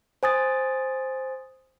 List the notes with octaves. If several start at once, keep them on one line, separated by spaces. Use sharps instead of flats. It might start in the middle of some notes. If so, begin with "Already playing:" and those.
C5 G#5 D#6 A6